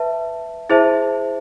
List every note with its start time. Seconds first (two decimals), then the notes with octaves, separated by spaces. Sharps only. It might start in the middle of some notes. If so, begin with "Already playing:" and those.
Already playing: B4 E5 A5
0.70 E4 G#4 C5 E5 A5